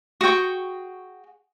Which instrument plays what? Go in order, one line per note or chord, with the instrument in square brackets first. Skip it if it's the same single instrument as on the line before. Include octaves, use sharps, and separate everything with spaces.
[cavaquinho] F#4 G#4 G5 C#6